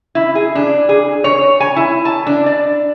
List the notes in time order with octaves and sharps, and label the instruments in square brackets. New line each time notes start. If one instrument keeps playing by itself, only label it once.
[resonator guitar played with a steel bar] E4
G#4
D4
G#4
C#5
G#5
E4
A5
D4
D5